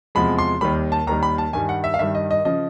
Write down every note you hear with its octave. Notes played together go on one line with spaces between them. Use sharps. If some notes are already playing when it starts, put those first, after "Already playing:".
E2 C3 F3 G#3 B5
C6
D#2 D#3 G3 B5
A5
D#2 D#3 G3 A#5
B5
A5
G2 D#3 G3 G#5
F#5
E5
F5
G2 D#3 G3 E5
D#5
D#5
C#3 F3 D#5